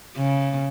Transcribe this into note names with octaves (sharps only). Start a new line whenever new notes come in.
C#3